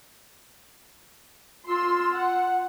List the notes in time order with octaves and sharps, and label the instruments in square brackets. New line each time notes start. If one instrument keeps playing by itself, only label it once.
[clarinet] F4 [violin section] C6 E6
[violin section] F#5